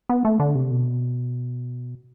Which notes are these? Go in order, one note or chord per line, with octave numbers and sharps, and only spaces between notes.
B3
A3
D3
C3
B2